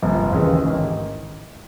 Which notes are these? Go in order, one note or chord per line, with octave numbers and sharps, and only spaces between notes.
G1 F2 C3 F3 A#3
D#2 C#3 E3 G#3 C#4
A1 G#2 D#3